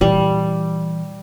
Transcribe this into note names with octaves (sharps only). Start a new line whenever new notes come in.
A#2 E3 G3